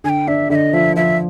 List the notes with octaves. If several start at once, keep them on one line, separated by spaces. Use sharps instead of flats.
D3 G#5
G5
D4 E5
D3 E5
D#5
F3 E5
F3 E5